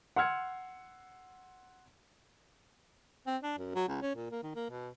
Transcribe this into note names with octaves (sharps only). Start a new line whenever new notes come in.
F#5 C6 E6 F6 G#6 C#7
C4
D4
F#2
F#3
C#2
C#4
A#2
A#3
D#3
A#3
B2